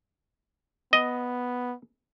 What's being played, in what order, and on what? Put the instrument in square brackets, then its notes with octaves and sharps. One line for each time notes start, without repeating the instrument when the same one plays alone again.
[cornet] B3 [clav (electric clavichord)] D#5